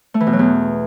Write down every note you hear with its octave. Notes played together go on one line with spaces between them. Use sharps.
A3
E3
B2
F#3
E2